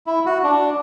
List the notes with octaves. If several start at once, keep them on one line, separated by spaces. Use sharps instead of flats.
E4
F#4
D4